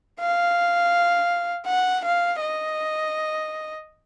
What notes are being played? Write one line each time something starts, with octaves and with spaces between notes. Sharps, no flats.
F5
F#5
F5
D#5